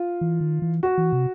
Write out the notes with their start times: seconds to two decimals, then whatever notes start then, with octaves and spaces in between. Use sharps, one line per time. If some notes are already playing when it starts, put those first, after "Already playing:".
Already playing: F4
0.21 E3
0.41 D#3
0.62 E3
0.83 F#4
0.98 E3
1.13 C3